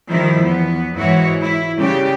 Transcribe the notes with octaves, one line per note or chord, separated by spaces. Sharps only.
D#3 F3 G3 E4
E2 B3
G#2 E3 G#3 E4 F#4 C#5
E4
C#3 G3 G4